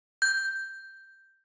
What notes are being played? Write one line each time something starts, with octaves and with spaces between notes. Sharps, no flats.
G6